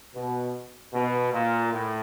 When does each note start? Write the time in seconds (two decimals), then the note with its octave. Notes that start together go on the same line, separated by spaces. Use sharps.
0.15 B2
0.93 B2
1.33 A#2
1.72 A2